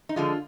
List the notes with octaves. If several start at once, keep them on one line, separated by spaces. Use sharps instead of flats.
D#4
D3 F3 G#3 F4